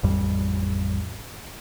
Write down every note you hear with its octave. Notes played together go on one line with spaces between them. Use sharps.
A1 F2 G3